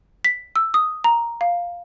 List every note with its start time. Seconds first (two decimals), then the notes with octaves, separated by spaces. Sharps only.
0.25 B6
0.56 E6
0.74 D#6
1.04 A#5
1.41 F5